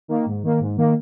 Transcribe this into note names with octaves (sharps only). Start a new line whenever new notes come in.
D#3 A#3
G#2
D#3 A#3
G#2
D#3 A#3